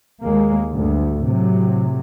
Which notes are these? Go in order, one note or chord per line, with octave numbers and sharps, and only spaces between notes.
D#2 G#3 A#3
D2 G2
A2 C3 F#3